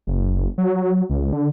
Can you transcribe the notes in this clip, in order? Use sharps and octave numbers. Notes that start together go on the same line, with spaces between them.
F#1
F#3
C#2
D3